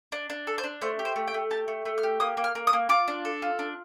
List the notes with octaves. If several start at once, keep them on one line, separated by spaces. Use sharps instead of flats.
D4
D4
A4
C5
D4
A3 C5
G4
C5
A3
G5
A3
G4 A5
A3
A3
F6
G4
A#3 D#6
A#3
F6
A#3
D#6
A#3
F4 D6
D4
A4
F4
D4